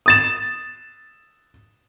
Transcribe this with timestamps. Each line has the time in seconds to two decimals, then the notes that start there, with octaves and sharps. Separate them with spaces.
0.06 D#6 A6 E7